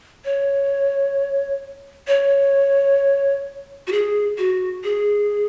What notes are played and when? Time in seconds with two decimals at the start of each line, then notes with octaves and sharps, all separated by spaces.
0.25 C#5
2.07 C#5
3.87 F#4
3.92 G#4
4.38 F#4
4.84 G#4